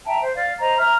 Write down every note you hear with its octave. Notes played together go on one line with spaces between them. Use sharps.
E5 G5 A5 A#5
C5
D5 F5
C5 D#5 A#5
E5 A#5 F6